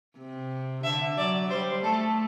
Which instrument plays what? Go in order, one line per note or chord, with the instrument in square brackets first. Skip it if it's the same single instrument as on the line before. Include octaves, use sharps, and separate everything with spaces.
[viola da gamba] C3
[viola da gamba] D3 [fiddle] E5
[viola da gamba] F#3 [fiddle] D5
[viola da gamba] G3 [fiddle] C5
[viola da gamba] A3 [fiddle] A4